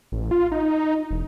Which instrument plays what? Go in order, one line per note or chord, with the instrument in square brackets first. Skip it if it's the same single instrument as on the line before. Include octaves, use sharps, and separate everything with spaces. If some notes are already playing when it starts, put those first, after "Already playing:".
[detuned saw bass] A1
F4
D#4
E1